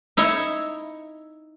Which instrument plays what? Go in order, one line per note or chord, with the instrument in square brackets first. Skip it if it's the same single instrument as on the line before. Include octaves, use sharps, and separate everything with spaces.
[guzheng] D#4 E4 C#5 E5